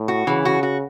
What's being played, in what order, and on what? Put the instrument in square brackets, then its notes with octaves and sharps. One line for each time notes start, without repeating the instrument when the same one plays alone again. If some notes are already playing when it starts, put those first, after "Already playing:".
Already playing: [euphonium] A2
[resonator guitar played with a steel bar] F#4
[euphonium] C#3 [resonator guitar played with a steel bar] E3
[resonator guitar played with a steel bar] F#4
F#4